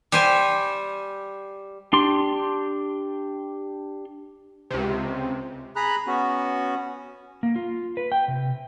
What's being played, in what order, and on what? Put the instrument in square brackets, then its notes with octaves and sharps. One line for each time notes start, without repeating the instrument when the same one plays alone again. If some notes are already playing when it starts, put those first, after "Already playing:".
[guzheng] G3 C5 G#5
[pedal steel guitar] D4 G4 C6
[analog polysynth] C#2 C3
[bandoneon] G#4 A#5 B5 F#6
B3 C#4 F#4
[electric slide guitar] A#3
F4
B4
G5
C3